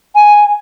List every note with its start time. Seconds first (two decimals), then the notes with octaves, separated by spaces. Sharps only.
0.15 G#5